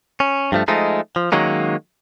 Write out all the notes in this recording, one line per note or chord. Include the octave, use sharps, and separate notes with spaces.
C#4
G2 F3 A3
F3 G#3 A3 D#4
F3
D#3 F#3 G#3 A#3 C#4